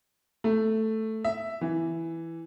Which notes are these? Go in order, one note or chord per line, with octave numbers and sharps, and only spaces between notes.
A3
E5
E3